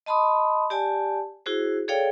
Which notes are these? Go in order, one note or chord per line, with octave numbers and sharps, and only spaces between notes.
D#5 A5 B5 C6 D#6
G4 D5 G#5 A5
E4 F#4 G#4 C5
G#4 A4 C#5 D5 F5 G5